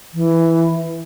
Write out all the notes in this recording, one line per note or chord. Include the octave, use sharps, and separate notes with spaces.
E3